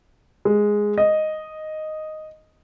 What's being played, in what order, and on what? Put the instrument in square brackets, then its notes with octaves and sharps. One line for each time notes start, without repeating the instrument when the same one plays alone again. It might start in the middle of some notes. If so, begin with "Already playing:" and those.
[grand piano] G#3
D#5